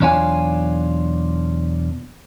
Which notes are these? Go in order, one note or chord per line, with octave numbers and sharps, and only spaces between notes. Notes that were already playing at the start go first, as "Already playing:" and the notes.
B1 E2 D4 F4 C#5 G#5